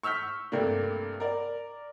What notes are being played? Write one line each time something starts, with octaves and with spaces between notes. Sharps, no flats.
C#6 E6 F6 G6 B6
G2 C3 A3 A#3 D4
A#4 D5